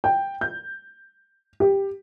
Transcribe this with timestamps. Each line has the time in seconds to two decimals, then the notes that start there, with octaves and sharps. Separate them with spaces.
0.04 G5
0.41 G6
1.60 G4